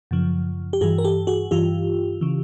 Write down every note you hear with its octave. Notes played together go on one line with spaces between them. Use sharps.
F#2 C#3 F3
G4
G2 E3 F#4 G#4
A#4
G4 A4
F#4 G#4
G2 E3 F4 G4
C#3 E3